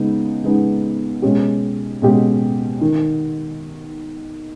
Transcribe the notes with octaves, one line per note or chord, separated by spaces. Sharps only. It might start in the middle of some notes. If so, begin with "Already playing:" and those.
Already playing: C#3 G#3 B3 D#4
C#3 G#3 B3 D#4
B2 G#3 C#4 G4
B2 G#3 C#4 G4
D#3